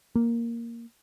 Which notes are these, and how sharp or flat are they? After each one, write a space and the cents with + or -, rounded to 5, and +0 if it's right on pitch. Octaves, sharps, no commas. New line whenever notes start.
A#3 +0